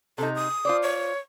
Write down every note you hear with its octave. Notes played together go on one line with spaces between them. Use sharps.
C3 D#4 A4
D#6
F4 C5 D5
C#5